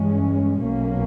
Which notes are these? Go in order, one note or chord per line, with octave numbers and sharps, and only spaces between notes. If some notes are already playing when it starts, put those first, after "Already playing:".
Already playing: G2 E3 G#3 C#4
B1 B2 A#3 C#4